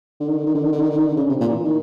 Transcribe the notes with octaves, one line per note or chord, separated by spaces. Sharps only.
D3
D#3
D3
D#3
D3
D#3
D3
D#3
D3
D#3
D3
C#3
C3
A#2
E3
D#3